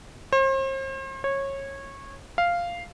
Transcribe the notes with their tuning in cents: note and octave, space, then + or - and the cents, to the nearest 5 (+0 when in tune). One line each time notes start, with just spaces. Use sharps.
C5 +40
C#5 -20
F5 -5